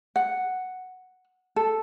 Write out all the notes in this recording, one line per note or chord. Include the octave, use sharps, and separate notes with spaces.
F#5
A4